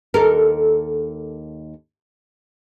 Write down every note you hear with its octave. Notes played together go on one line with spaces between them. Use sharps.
D#2 A4 A#4